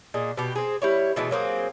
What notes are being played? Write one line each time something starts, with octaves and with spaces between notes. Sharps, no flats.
A#2 G#4 D#5
B2 G4
C4 G#4
G3 E4 C#5
B2 E3 G#3 A3
F#3 A#3 C4 G#4